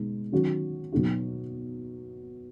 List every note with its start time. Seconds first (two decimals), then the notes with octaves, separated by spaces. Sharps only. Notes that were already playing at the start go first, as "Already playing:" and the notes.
Already playing: B2 G#3 D#4
0.32 D#3 F#3 C#4 F#4
0.92 B2 F#3 D#4 F#4